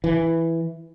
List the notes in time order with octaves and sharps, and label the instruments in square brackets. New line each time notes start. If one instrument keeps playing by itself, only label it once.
[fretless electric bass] E3